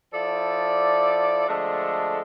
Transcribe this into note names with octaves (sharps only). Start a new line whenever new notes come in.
F3 E4 A4 D5
D3 F3 G#3 A3 D4 A4